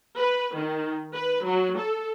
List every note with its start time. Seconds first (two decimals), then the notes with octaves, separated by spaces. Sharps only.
0.18 B4
0.55 D#3
1.14 B4
1.45 F#3
1.77 A4